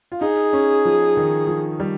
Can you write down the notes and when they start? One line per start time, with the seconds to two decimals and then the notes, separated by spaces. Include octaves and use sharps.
0.12 F4
0.21 D#4 G#4
0.53 C#4
0.85 F3
1.17 D#3
1.47 F3
1.80 G3